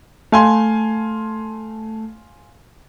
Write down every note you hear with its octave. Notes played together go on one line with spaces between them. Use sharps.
A3 F5 G#5 C6